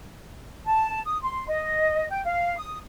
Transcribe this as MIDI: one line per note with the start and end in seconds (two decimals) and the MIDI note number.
0.66 1.00 81
1.05 1.18 87
1.22 1.46 84
1.48 2.08 75
2.10 2.23 79
2.25 2.55 77
2.57 2.78 87